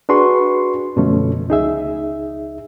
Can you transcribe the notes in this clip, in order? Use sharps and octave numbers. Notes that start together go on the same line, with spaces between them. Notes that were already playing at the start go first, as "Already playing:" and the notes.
D4 F#4 G#4 B4 C6 C#6
F#2 B2 D3 F3 A3 C#4
C#2 D#4 G#4 E5